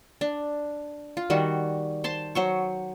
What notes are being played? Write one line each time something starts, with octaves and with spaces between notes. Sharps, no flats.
D4
F4
D#3 G3 F#4
C5 A5 C6
F#3 C5 C#6